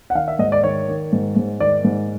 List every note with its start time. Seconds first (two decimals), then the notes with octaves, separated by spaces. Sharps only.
0.10 F#5
0.15 D#3 F5
0.28 E5
0.39 G#2 D#5
0.52 D5
0.63 D#3 C#5
0.88 D#3
1.12 G#2
1.36 G#2
1.60 D#3 D5
1.84 G#2